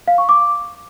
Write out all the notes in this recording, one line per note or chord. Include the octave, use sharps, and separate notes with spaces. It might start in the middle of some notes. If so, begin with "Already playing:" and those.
F5
C#6
D6